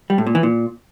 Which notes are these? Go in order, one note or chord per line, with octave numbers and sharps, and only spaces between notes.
G3
A2
A#2
E3
A#2